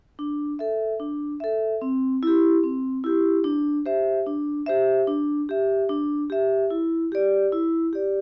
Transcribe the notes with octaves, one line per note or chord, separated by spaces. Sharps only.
D4
A4 E5
D4
A4 E5
C4
E4 G4
C4
E4 G4
D4
G4 C5 E5
D4
G4 C5 E5
D4
G4 E5
D4
G4 E5
E4
G4 D5
E4
G4 D5